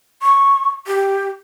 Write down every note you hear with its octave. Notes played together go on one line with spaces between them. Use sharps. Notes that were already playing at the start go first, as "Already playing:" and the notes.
C#6
G4